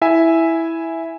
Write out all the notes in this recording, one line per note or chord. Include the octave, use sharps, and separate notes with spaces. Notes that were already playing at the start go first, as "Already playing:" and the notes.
E4 E5 G#5